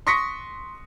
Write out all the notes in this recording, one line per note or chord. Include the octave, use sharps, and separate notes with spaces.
C6 C#6 D#6 A#6 B6 C#7